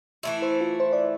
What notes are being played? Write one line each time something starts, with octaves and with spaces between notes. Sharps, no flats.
E3 A3 E4
C5
F4
C5
D5